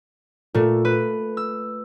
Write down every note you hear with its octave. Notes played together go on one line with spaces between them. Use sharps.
A#2 A3
B4
E6